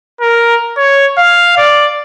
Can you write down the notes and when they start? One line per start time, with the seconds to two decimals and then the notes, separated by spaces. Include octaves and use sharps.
0.21 A#4
0.77 C#5
1.18 F5
1.57 D5